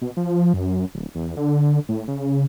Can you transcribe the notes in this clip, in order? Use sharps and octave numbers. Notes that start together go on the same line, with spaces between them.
B2
F3
F#2
D1
E2
D3
A2
C#3